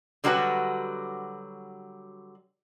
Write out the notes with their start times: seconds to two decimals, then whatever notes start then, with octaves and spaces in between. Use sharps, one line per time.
0.24 D3 F#3 G3 F#4 G#4 B4